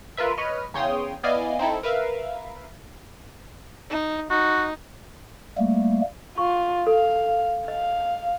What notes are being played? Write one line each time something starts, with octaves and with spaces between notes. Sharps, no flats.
F4 A#4 B4 E5
B4 C#5 D#5 F6
E2 C#3 C#5 G5 C6 D#6
B3 E4 D5 D#5 F5 G#5
C4 D#4 E4 A4
A#4 B4 E5 F5
D#4
D#4 F#4
G3 A3 A#3
F4 C#6
A4 F5
D#5 F5